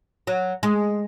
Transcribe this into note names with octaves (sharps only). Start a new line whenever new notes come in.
F#3
G#3